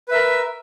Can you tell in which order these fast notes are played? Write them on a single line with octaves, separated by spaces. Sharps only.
B4 E5 A#4